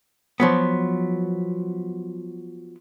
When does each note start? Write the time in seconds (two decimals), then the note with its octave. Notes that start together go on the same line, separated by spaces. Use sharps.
0.40 F3 F#3 B3